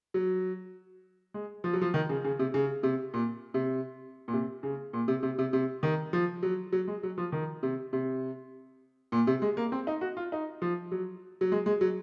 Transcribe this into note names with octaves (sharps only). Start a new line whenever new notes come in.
F#3
G#3
F3
F#3
F3
D#3
C#3
C#3
C3
C#3
C3
A#2
C3
A#2
C3
C#3
A#2
C3
C3
C3
C3
D#3
F3
F#3
F#3
G#3
F#3
F3
D#3
C3
C3
A#2
C3
G#3
A#3
C4
D#4
F#4
F4
D#4
F3
F#3
F#3
G#3
G#3
F#3